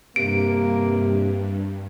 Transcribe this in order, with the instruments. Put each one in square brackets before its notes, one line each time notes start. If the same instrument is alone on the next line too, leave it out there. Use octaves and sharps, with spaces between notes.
[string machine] G2 [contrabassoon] C3 [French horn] A#3 [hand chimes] D7